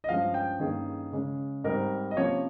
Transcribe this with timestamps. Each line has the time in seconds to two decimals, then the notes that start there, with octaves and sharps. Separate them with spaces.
0.04 D#5
0.09 G2 F3 G#3 C#4 F5
0.34 G5
0.60 G2 D#3 A#3 C#4 G#4
1.12 C#3 G#3 C#4
1.64 G#2 G3 C4 A#4
2.11 D#5
2.17 C3 F3 A#3 C#4 C#5